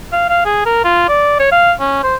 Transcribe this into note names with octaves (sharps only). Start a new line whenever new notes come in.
F5
F5
G#4
A#4
F4
D5
C#5
F5
C#4
C5